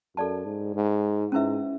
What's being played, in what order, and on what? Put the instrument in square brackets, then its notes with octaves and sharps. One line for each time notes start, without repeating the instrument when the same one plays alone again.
[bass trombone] F#2 [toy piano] A4 D5 A5
[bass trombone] G#2
G#2
[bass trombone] G#2 [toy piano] C#4 E4 B4 E5